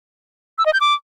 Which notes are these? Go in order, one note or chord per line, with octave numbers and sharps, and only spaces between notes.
E6
D#5
G6
D6